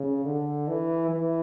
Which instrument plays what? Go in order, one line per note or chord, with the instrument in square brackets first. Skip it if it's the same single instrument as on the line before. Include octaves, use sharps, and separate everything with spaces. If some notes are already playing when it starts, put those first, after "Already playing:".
Already playing: [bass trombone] C#3
D3
E3
E3